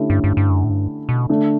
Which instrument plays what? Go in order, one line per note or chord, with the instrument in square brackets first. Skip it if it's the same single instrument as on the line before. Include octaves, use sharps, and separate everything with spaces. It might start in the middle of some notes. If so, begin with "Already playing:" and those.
Already playing: [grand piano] D3 A3 C#4 E4 G4
[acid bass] G2
G2
G2
F#2
A2
G2
B2
[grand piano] D3 A3 D4